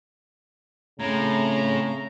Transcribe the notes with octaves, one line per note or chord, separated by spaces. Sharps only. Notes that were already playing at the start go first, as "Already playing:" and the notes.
A2 C#3 C4 G#4 A#5